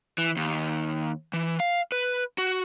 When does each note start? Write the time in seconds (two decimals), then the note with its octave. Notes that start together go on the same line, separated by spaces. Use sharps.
0.18 E3
0.37 D#2
1.33 E3
1.60 F5
1.92 B4
2.38 F#4